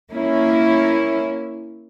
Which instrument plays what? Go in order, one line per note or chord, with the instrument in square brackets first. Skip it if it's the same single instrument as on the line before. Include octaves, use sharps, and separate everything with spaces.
[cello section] A#3 C#4 E4